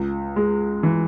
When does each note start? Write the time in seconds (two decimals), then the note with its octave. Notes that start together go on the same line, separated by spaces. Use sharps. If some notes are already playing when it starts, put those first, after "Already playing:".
Already playing: C#2
0.36 G#3
0.83 E3